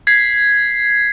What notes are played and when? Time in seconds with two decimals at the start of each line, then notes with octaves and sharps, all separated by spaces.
0.07 G#6 B6 C7